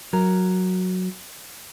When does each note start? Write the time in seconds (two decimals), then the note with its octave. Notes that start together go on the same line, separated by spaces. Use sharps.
0.13 F#3 A#4